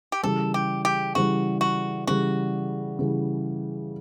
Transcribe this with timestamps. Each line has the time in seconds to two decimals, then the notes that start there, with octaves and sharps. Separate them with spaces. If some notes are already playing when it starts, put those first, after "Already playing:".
0.12 G4
0.23 C#3 E3 G3 A4
0.54 G4
0.85 G4
1.15 C#3 E3 G3 F#4
1.61 F#4
2.07 C#3 E3 G3 F#4
2.99 C#3 E3 G3